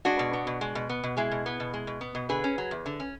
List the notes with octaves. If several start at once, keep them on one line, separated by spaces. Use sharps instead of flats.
G#3 D4 F#4
B2
B3
B2
G#3
B2
B3
B2
G#3 E4 G#4
B2
B3
B2
G#3
B2
B3
B2
D3 G#4 B4
C#4
F#3
E2
D3
C#4